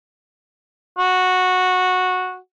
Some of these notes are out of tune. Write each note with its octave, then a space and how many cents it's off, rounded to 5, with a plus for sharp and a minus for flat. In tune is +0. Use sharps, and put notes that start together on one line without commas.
F#4 -10